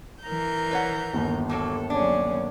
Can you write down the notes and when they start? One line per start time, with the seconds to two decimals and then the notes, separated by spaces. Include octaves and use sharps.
0.24 E3 A#4 G6
0.71 B4 C#5 F#5
1.14 G1 D#2
1.49 A#2 F#3 A#3 A4
1.90 F#3 C#4 D4 G#4